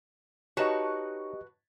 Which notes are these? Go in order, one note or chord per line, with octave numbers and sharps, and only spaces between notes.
D#4 F#4 G4 B4 C#5 D#5 A5